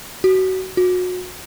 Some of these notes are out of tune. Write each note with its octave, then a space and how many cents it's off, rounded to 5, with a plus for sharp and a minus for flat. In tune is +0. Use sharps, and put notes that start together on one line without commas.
F#4 +25
F#4 -30